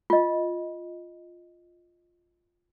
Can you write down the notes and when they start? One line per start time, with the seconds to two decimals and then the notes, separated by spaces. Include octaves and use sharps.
0.10 F4 D#5